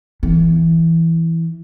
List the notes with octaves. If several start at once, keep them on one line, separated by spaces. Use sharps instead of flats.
E3